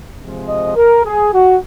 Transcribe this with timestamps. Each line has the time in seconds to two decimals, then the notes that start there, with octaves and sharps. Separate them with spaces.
0.18 C3 F3 G#3
0.48 D#5
0.76 A#4
1.05 G#4
1.33 F#4